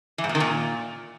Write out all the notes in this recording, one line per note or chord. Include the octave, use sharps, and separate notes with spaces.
E3
G#2
A#2
D#3
A#2